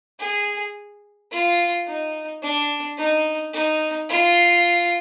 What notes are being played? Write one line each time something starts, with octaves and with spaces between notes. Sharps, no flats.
G#4
F4
D#4
D4
D#4
D#4
F4